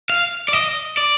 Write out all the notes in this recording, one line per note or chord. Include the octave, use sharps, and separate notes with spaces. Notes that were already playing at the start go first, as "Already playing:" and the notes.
F5
D5
D#5
D5